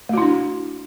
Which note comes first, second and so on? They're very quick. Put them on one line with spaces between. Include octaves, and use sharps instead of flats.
A3 F#4 E4 D4